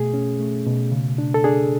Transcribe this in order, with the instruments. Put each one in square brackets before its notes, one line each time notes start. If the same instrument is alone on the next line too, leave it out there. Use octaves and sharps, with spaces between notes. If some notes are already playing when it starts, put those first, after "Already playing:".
Already playing: [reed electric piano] B2 A3 G#4
C#4
A3
B2
C#3
D4
A4
D4 G#4